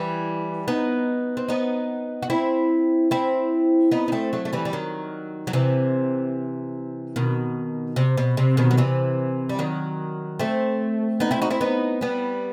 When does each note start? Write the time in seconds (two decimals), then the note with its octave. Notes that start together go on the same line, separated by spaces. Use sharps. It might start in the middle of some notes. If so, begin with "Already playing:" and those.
Already playing: E3 G3
0.68 B3 D#4
1.37 C4
1.49 B3 D#4
2.23 F#4
2.30 C4 E4
3.11 C4 E4
3.91 B3 D#4
4.08 D#4
4.12 A3 C4
4.33 F#3 A3
4.45 A3
4.53 E3 G3
4.65 G3
4.73 D#3 F#3
5.47 F#3
5.53 C3 E3
7.16 B2 D#3
7.96 C3
8.17 B2
8.37 C3
8.57 B2 D#3
8.71 F#3
8.77 C3 E3
9.49 G3
9.59 D#3 F#3
10.39 A3 C4
11.20 B3 D#4
11.31 C4 E4
11.41 D#4 F#4
11.50 C4 E4
11.61 B3 D#4
12.01 G3 B3